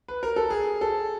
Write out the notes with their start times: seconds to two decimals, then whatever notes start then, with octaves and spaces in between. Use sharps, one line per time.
0.08 B4
0.23 A#4
0.36 A4
0.50 G#4
0.81 A4